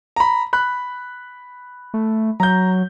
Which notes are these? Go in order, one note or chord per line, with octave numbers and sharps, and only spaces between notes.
A#5 B5
B5 F#6
A3
F#3 A#5 G6